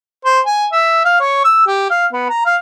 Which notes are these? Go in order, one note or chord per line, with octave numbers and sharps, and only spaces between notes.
C5
G#5
E5
F5
C#5
E6
G4
F5
B3
A#5
F5